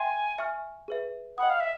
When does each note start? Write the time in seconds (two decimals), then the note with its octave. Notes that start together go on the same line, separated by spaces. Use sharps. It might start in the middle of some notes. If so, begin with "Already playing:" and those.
Already playing: E5 G5 G#5 C6
0.38 E5 G#5 C#6 F6
0.88 G#4 B4 E5
1.38 D#5 F#5 G5 B5 D#6
1.50 F5
1.60 E5